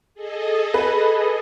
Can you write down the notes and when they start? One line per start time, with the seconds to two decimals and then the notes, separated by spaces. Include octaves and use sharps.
0.14 G#4 A4 D#5
0.74 B4